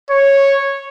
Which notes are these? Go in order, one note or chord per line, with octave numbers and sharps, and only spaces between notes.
C#5